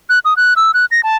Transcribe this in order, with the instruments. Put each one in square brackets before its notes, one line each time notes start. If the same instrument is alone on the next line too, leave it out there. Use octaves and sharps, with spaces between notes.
[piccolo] F#6
D#6
F#6
E6
F#6
A#6
A5